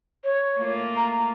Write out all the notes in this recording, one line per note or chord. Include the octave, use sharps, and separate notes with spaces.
C#5
A3 A#3 F4
A#5